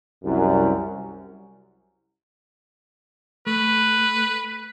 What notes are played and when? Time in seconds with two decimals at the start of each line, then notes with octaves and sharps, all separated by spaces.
0.24 C2 F#2
3.47 A3 B4